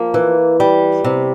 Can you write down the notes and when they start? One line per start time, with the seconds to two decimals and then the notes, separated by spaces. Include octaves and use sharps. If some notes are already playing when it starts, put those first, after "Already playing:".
Already playing: F3 A#3
0.14 E3
0.60 G3
1.04 C3